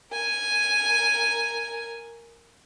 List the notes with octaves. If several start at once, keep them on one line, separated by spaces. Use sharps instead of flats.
A#4 G#5